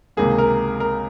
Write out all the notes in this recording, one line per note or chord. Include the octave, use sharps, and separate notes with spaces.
C#2 C3 D#3 A#3 G#4
A#4
A#4